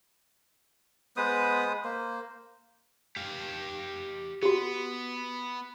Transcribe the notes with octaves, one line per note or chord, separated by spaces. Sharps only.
G#3 B3 B4 C5 D#6
A#3 C5
G4 F5
B3 F#4 G4